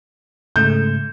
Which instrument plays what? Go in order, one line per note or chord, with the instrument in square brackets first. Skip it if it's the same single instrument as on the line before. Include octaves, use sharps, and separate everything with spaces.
[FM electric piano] G#2 C#3 A3 [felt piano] G6